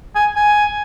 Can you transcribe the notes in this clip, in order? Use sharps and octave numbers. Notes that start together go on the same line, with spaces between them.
G#5
G#5